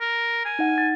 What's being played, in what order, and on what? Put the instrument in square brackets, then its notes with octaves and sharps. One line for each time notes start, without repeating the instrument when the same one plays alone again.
[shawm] A#4
G#5
[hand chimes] D#4 F#5
A6